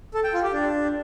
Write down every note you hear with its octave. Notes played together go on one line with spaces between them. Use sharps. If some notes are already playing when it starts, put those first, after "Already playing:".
A4
G5
F4
G4
D4